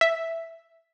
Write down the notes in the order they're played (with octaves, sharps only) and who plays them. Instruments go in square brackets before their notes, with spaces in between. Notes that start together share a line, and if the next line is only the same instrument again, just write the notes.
[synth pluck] E5